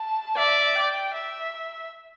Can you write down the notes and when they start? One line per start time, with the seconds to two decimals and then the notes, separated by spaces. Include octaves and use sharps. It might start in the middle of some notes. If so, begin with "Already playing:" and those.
Already playing: A5
0.37 D5 E5
0.76 G5
1.14 E5